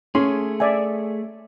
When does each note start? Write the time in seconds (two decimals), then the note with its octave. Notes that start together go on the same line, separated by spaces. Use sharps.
0.15 A3 C#4 G#4 C6
0.60 D5 E5 G#5